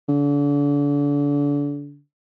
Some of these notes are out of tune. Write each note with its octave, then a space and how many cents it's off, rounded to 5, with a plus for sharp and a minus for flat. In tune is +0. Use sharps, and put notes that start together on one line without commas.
D3 -35